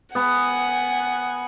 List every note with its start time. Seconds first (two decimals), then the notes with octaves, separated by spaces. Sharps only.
0.15 B3 F#5 G#5